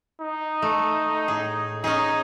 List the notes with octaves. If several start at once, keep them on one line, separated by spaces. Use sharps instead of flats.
D#4
A3
A2 G#4
C#4 D#4 G#4